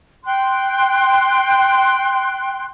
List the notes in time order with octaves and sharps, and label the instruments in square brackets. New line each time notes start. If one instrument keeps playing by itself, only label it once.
[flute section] G5 C6 F#6